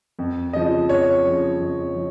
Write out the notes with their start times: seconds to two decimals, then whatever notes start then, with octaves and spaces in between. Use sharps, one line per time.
0.19 F2
0.53 C#3 F3 D#5
0.89 F2 C#5
1.25 C#3 F3
1.60 F2
1.96 F3